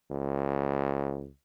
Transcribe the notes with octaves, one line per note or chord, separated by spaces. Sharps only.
C#2